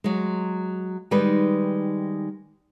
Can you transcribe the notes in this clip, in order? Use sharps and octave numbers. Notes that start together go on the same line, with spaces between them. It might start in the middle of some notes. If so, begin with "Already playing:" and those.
F#3 G#3
D#3 G3 G#3 D#4 B4